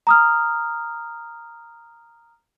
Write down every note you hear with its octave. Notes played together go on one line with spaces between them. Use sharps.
A#5 D#6 F6